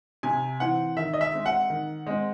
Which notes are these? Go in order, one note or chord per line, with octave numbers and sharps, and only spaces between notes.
C3 G#5
E3 C4 F#5
D#3 E5
D#5
E5
G#3 C4
F#5
D#3
G#3 C4